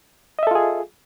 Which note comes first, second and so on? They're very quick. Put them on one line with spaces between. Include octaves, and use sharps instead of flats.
D#5 E5 A4 F4 G#4